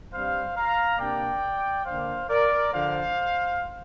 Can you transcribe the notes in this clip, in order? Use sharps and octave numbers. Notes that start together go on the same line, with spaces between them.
G2 G3 C4 C5 F5
F5 A#5
C3 A#3 D4 D5 G5
D3 A#3 D4 C5 F5
A#4 D5
D3 F3 D4 C5 F5